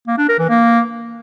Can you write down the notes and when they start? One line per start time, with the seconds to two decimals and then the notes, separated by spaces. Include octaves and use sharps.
0.08 A#3
0.18 D4
0.29 A#4
0.39 E3
0.49 A#3